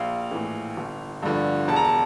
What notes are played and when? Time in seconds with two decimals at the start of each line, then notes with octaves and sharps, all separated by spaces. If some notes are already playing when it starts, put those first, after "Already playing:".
Already playing: A#1 F5
0.31 A2 E3
0.77 G1
1.22 G2 D3 F3
1.68 E1 A5
1.76 A#5
1.85 A5